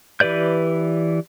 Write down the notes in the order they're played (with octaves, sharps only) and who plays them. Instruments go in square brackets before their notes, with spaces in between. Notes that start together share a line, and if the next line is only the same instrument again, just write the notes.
[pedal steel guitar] E3 G4 B4 D5 G6